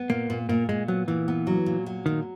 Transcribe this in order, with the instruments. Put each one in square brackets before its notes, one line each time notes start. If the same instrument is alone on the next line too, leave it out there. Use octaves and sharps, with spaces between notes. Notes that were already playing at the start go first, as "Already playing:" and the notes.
Already playing: [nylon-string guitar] B3
[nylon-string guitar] A#2 [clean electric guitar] A#3
[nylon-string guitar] A#2
[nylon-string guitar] A#2 [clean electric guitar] A#3
[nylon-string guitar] A#2 [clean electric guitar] G#3
[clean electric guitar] F#3 [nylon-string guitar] B3
[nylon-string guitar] A#2 [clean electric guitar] E3
[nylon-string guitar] B3
F#3
A#2
F#3
[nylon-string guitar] A#2 [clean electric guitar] D#3